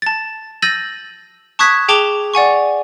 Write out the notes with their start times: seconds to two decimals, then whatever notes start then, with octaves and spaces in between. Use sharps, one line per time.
0.02 A5 A6
0.62 E6 G6 A6 A#6 D#7 F#7
1.59 A5 C#6 D#6 F#6 G#6 B6
1.88 G#4 G5 A5 D6 F7 G7
2.34 D5 F#5 G#5 C#6